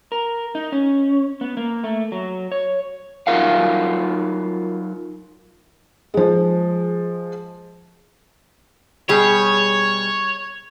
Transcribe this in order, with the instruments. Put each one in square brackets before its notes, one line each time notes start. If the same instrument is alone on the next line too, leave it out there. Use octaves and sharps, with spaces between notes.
[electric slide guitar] A#4
D#4
C#4
B3
A#3
A3
F#3
C#5
F#3 D#4 F4 A#4 F5 F#5
[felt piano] F3 G#3
[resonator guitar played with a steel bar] B2 G3 G#4 [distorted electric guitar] C#5